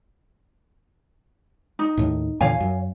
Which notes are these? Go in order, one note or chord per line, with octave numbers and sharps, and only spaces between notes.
D#4
D#2 A2
E2 A#2 D3 C#5 F5 G#5
F#2